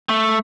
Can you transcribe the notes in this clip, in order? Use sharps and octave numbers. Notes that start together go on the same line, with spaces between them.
A3